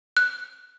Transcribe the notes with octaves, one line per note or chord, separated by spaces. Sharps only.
F#6